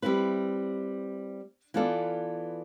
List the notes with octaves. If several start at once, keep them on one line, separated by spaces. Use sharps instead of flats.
G3 C4 E4 B4
E3 B3 F4 A4 D5